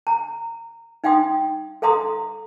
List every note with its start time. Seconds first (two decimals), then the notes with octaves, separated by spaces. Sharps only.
0.07 A#5
1.04 D#4 F5 G5 C6 D#6
1.82 A4 F5 A#5 C6 D#6